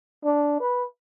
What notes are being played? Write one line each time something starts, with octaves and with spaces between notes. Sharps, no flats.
D4
B4